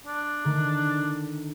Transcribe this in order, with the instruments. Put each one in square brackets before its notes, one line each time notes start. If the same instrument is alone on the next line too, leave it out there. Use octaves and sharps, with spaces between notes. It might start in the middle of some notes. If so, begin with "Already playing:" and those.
[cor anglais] D4
[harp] D3 D#3 A3